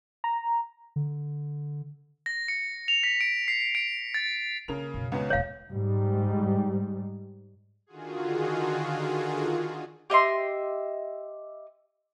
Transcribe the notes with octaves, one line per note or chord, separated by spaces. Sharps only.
A#5
D3
A#6
C#7
F7
B6
D7
C7
D7
A6
C#3 A#3 A#4 F7
F#2 B2
C#2 B3 C#4
D#1 A#2 C#5 F5
G#2 G3
D3 D#3 F4 F#4 G#4
G4 D#5 E5 C6